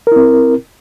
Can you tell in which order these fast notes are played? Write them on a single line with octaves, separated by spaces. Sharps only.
A#4 E4 C4